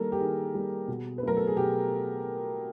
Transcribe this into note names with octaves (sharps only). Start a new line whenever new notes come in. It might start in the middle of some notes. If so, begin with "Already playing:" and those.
Already playing: D#3 G3 A#3 A4 A#4
G4
D#3 G#4
G3 A#3
B2
B4
F#3 A3 A#4
A4
G#4
B2 G4